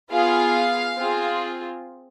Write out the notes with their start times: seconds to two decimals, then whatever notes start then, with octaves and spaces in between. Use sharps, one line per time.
0.12 B3 F4 G#4 F5
0.97 C4 F4 G#4